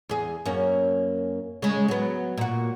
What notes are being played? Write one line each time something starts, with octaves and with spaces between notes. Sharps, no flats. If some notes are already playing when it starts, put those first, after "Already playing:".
E2 G#4
F#2 A#3 C#4
C#3 G#3
F#3 B3
A#2 F#4